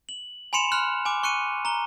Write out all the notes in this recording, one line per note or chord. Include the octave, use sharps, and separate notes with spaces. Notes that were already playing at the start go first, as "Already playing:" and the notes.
F#7
G#5 B5 C6 C#7 E7 F7
B5 C6 F6 F#6
G#5 D6
C#6 F#6 C#7 D#7
A#5 G7